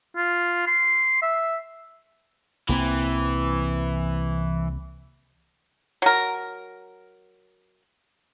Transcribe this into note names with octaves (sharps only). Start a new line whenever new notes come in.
F4
C6
E5
C2 E3 A#3 C4
F#3 A#4